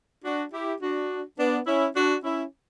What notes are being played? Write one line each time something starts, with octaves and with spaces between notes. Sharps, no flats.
D4 F#4
E4 G4
D4 F#4
B3 D4
C#4 E4
D4 F#4
C#4 E4